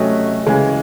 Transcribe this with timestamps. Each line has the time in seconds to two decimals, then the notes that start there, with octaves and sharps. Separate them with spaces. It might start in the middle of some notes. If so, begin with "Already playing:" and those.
Already playing: C3 F#3 A3 C#4 D#5
0.46 C#3 E3 G#3